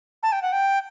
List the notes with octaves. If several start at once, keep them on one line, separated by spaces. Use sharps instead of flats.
A5
G5
F#5
G5